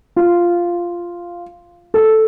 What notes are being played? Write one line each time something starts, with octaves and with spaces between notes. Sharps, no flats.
F4
A4